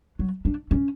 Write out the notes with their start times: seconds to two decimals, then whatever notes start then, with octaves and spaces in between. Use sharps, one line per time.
0.19 F#3
0.45 D4
0.71 C#4